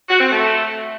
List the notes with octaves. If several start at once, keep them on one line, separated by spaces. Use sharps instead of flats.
F#4
C4
A3